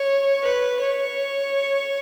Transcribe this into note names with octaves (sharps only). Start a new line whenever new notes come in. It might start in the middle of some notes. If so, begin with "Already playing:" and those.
Already playing: C#5
B4
C#5